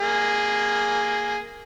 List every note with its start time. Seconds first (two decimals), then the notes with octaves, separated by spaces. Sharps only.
0.01 A#3 G#4